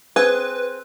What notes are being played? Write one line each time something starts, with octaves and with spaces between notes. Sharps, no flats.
C4 G#4 B4